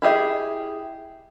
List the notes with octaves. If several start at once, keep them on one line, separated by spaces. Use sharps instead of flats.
E4 G4 G#4 E5